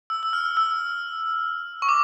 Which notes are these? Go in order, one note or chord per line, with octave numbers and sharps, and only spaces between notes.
E6
E6
F6
E6
C#6
D6